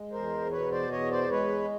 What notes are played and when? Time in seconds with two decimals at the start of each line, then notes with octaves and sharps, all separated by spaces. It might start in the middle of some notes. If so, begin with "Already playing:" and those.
Already playing: G#3
0.12 E2 A#4 C5
0.51 B2 B4 C#5
0.71 C5 D5
0.91 E2 C#5 D#5
1.11 C5 D5
1.30 G#3 B4 C#5